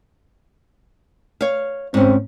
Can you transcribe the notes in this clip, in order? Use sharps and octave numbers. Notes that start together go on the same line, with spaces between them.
C#5 F5
G#2 C4 C#4